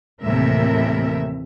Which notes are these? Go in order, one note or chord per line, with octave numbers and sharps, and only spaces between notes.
D#2 A2 C3 E3 A#4 E5